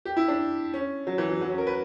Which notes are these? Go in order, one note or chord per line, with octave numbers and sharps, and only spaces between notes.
G4
E4
D4
C#4
F#3
E3
F#3
F#3
C#4
A#4
B4